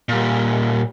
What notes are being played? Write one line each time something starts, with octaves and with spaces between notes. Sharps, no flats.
A#2 G3